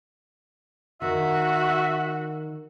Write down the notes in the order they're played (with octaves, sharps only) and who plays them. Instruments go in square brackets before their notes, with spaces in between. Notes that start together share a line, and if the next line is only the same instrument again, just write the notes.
[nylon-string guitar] D#3 [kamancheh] F#4 [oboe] E5